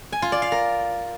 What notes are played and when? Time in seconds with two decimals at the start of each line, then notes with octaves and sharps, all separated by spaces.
0.12 G#5
0.22 F4
0.32 D5
0.42 F5
0.52 A#4